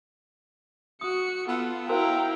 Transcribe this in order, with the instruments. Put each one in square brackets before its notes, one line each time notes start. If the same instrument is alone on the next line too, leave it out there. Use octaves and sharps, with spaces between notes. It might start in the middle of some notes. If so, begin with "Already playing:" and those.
[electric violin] F#4 C#7 [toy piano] D#6
[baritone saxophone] B3 [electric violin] F4 A4
[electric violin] E4 A#5 [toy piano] F#4 A#4 C5 [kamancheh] F5 G5